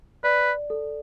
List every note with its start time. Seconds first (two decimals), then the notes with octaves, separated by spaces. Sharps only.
0.24 B4 D5
0.70 A4